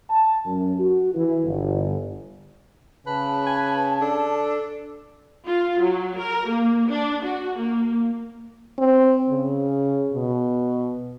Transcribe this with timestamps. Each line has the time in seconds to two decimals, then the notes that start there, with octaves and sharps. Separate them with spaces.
0.10 A5
0.46 F#2
0.80 F#4
1.14 E3
1.45 G1
3.07 C#3 B4 A5
3.46 G#5
4.01 D4 A4
5.46 F4
5.80 F#3
6.18 A#4
6.49 A#3
6.89 D4
7.23 F#4
7.56 A#3
8.79 C4
9.30 C#3
10.13 B2